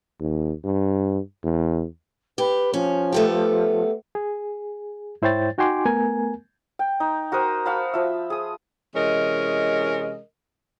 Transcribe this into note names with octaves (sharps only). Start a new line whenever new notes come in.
D#2
G2
E2
G4 B4
F3 C#4
A3 B3 G4
G#4
G#2 E4 C5 C#5 G5 A6
D#4 F#4 G5 G#5 C6 D6
A3 B3 A#4 G#5
G5
D#4
F#4 A#4 C5 D#6
F#4 F5 A5 B5
F3 E5
G#4 D#6
C3 E3 G#3 C#4 A#4 D#5